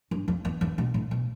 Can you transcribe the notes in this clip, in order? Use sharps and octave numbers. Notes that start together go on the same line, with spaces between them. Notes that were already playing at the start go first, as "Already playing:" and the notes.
G2
F2
E2
E2
B2
A2
B2